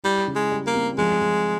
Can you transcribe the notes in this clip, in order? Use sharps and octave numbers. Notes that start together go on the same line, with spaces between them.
G3 E4
C#3
G#3
G3
A#3
C4
F3 G#3
F3